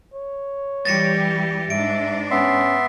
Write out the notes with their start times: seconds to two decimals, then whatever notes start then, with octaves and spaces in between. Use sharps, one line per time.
0.14 C#5
0.85 E3 G3 G4 A6 A#6 C#7
1.70 G#2 D4 E5 D7
2.31 B3 C#4 E5 C6